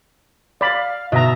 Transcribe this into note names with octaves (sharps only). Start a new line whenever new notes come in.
D5 F5 B5
B2 D#5 E5 A#5